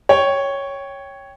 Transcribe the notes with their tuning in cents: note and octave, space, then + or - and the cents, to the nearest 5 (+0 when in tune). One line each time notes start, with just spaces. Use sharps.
C#5 +0 G5 +0